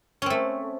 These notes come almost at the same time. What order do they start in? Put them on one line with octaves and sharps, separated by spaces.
C#4 C4 A3